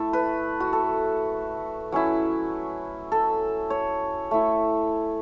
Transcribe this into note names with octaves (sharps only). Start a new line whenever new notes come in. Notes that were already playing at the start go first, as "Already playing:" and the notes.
Already playing: A3 E4 A4
B4
F#4
A4
F#3 C#4 E4
A4
C#5
A3 E4